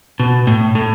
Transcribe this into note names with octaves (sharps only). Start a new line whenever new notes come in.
B2
A2
A2